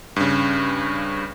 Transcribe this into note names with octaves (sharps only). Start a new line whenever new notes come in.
G2 C#3